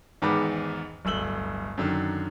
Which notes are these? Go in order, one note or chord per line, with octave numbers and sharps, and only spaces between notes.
E2 G#2 D#3 B4 D6
D1 G1 E6 F#7 G7
F#2 D3 D#3